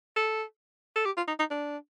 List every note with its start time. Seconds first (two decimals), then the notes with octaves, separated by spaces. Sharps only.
0.16 A4
0.96 A4
1.06 G4
1.17 F4
1.28 D#4
1.39 D#4
1.50 D4